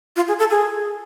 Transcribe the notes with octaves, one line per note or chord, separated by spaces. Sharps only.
F4
G#4
A4
G#4